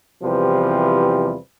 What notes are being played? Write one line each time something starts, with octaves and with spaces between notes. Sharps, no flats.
E2 C3 E3 F3 G3 B4